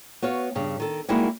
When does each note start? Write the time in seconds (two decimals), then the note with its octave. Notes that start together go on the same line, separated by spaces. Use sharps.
0.22 B3 F#4 C#5 F5
0.55 G2 C#3
0.80 D#3 A4
1.09 G3 G#3 A#3 D#4 E4 F#4